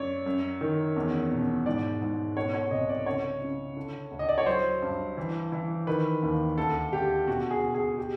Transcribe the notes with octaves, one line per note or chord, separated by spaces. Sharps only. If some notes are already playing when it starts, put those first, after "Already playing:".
Already playing: F#2 C#5 D5
F#2
D#3
E2
B2
G#2 D5
G#2
B2 C#5
C#5
C2 D#5
D5
C#3 C#5
C#3
D3
D2
D#5
D5
C#5
F#3 C5
G2
E3
E3
D#3 B4
D#2
D2 A4
D2 G4
B2 F#4
G#4
B2
G#4
G4